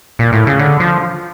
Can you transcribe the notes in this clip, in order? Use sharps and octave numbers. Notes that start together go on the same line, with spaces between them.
A#2
A2
C#3
D3
F3